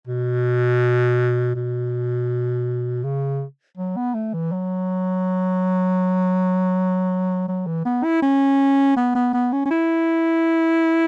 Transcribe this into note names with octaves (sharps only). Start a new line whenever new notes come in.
B2
B2
C#3
F#3
B3
A3
E3
F#3
F#3
E3
B3
E4
C#4
B3
B3
B3
C#4
C#4
E4